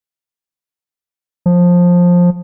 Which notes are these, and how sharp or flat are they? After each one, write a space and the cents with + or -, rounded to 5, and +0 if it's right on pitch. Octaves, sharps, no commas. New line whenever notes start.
F3 +15